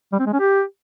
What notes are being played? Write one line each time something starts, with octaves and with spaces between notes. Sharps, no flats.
G3
C4
G#3
C#4
G4